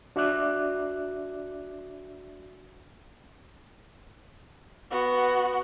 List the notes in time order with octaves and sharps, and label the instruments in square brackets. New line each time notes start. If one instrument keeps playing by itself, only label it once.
[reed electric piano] D4 F#4 D5 E5 D6 F#6
[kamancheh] B3 F#4